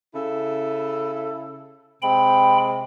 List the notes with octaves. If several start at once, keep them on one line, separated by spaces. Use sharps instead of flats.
C#3 E4 A4
C3 G#3 C4 G5 B5